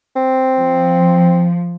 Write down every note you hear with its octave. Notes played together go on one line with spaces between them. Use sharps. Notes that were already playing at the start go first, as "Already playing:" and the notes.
C4
F3